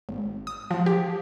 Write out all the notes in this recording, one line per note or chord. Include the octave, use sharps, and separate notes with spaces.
G#1
D#6
F3
G4